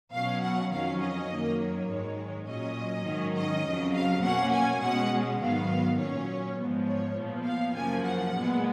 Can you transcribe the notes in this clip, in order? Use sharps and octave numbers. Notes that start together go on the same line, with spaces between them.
B2 F#3 C#4 F5
F#5
F2 D#3 F#3 C#4 F5
D#5
F#2 D#3 F#3 A#3
C#5
G#2 D#3 G#3
A#2 F#3 C#4 D#5
G#2 D#3 F#3 C#4
D#5
F2 C#3 F#3
F5
B2 A#3 C#4 F#5
G#5
B2 G#3 C#4 F#5
G#2 D#3 F#3 B3 F5
A#2 F#3 C#4 C#5
G#2 F3 G#3 B3
C#5
A#2 F3 B3
F5
F#2 C#3 F3 A#3 G#5
F#5
A#2 G#3 B3